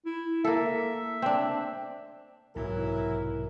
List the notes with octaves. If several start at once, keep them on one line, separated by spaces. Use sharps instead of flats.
E4
A#3 A4 E5
C4 D4
B1 G#2 C3 E3 F#3 E4 A#4